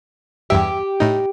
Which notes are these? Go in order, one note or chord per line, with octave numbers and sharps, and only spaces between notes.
E2 G2 G4 E5
A2 D#4